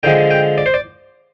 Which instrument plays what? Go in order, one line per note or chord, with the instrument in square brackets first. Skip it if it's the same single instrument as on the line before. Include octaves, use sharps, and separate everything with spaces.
[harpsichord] D3 F3 G#3 G5
G5
D5
C5
D5